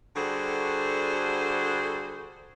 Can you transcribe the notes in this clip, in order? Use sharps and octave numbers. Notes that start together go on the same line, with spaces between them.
D3 G3 F#4 G#4 A4 C5